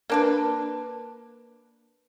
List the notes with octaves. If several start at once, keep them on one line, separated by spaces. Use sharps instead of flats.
A#3 D4 B4